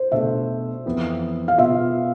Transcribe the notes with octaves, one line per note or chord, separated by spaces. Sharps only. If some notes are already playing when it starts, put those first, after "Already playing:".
Already playing: C5
B2 A3 D4 A4 E5
F2 E3 B3
F5
B2 B3 F4 E5